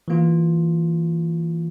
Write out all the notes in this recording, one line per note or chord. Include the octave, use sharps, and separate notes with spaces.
E3 A#3 F4